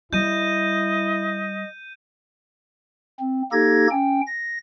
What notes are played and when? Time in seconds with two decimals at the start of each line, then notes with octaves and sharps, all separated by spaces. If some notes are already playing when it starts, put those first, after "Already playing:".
0.13 G3 E4 D#5 G6 D#7
3.20 C4
3.52 A#3 D#4 G4 A4 G#6 A#6
3.91 C#4 G5
4.27 A#6